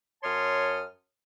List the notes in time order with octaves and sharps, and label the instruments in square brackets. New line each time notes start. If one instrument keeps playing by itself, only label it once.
[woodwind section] F#2 C#5 A5 C6 D#6 F6